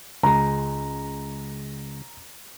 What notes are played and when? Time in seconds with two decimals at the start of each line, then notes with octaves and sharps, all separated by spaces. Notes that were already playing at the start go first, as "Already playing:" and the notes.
0.23 C#2 G#3 A#5